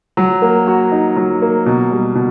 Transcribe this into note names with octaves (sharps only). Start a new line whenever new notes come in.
F#3
A#3
F#4
D#4
F#3
A#3
B2
G3
B2